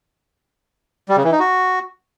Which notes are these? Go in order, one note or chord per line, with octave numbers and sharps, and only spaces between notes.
G3
C#3
E3
D#4
F#4